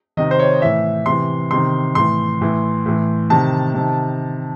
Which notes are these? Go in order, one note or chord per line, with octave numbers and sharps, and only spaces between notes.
C3 D#3 D#5
C5
C#5
A2 E3 E5
C3 E3 C6
C3 D#3 C6
A2 E3 C6
A2 E3
A2 E3
C3 D#3 A5
C3 D#3